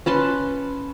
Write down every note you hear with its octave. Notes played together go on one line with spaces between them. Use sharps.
C#4 B4 A5 C6